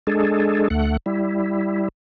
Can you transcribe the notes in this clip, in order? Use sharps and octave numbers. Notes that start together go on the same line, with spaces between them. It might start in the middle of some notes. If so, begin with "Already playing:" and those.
G#3 D4 G#4 A4
D2 A3 F#5
G3 E4